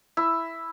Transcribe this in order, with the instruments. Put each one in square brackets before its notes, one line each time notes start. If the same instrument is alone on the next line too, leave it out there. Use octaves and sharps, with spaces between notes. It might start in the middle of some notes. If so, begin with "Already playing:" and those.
[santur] E4